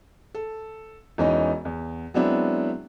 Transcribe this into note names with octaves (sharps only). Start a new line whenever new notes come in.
A4
E1 E3 C#4 D#4 D#5
E2
F#3 G#3 B3 C4 D4 E4